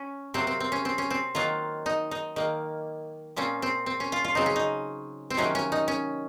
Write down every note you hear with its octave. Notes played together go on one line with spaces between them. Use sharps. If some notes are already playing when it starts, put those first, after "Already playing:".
Already playing: C#4
C3 F#3 A#3 C4
C4
C4
C#4
C4
C#4
C4
D#3 F#3 A#3 F4
D#4
D#4
D#3 A#3
A#2 F3 C4 C#4
C4
C4
C#4
F4
F4
C#3 F#3 C4 D#4
C#4
D#4
C4
C3 D#3 F#3 A#3 C#4
C#4
D#4
C#4